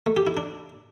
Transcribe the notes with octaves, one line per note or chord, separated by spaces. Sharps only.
A3
G4
E4
D4